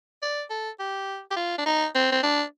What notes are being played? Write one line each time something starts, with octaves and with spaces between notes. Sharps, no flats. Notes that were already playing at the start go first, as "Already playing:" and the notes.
D5
A4
G4
G4
F4
D4
D#4
C4
C4
D4